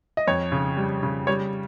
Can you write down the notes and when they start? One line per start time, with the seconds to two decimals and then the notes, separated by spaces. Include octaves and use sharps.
0.17 D#5
0.27 F2 C#5
0.52 C#3
0.77 G3
1.03 C#3
1.27 G3 C#5